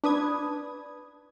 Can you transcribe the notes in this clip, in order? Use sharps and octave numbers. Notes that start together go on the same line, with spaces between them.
D4 B4 D#6 G#6